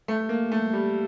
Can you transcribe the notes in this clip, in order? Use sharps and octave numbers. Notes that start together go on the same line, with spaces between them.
A3
A#3
A3
G3